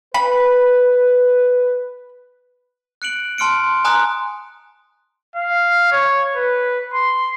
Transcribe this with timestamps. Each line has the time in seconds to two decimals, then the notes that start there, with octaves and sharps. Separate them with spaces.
0.14 B4 B5
3.02 F#6 C#7 D7 F#7
3.38 A5 C6 F6 C#7 D7
3.85 G#5 A#5 C6 D#6 F#6
5.36 F5
5.92 C#5
6.36 B4
6.93 C6